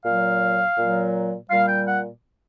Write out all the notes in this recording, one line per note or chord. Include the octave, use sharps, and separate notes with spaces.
A#2 F#3 F5
A#2 F#3
A#2 G3 F5
G5
F#5